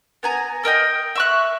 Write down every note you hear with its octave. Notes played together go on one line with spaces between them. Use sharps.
B3 G#5 A#5
A4 A#4 D#5 G5
E5 C#6 F#6